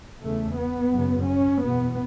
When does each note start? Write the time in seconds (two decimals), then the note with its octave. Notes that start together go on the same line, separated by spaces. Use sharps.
0.22 E2 C#3 A3
0.58 B3
0.93 F#2 C#3
1.28 C#4
1.63 E2 B2 B3